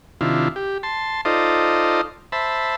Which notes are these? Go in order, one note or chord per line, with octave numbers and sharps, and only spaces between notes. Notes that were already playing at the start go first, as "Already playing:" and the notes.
C3 D#3 D4 E4 F4
G4
A5 C6
D#4 F4 A4 C5 D5 D#5
C5 E5 A5 B5